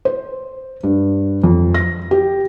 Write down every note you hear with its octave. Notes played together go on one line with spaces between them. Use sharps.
C5
G2
F2
A#6
G4